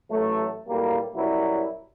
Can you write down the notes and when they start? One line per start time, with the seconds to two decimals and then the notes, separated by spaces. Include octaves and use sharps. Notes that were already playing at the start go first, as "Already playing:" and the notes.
0.11 A1 F#3 A3
0.68 B1 A2 G3 A#3
1.16 F#2 B2 F#3 G3 E4